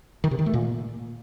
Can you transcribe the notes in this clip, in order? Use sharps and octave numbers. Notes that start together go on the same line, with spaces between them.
D#3
C3
D#3
A3
A#2